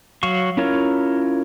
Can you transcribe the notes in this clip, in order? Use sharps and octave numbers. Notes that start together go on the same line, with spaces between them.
F#3 F#4 F5 C#6
C#4 E4 F4 A#4 C#5